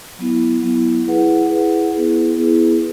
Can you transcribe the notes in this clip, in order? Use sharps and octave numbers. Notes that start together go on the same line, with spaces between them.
F#3 B3 E4
F#3 B3 E4
E4 G#4 B4 F#5
E4 G#4 B4 F#5
B3 E4 G#4 B4
B3 E4 G#4 B4